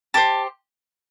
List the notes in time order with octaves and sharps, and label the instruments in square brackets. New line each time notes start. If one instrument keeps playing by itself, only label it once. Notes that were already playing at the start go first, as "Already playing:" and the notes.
[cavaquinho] G4 C5 A5